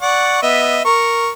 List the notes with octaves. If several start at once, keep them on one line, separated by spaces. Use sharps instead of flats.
D5 F#5 C#6
B3 D#5 E5
A#4 C#6